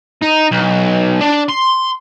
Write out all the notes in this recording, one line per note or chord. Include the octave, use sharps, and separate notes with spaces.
D#4
B1
D4
C6